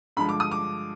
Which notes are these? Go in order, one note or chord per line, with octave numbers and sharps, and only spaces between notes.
G2 D3 F3 G#3 B5
D6
D#6
D6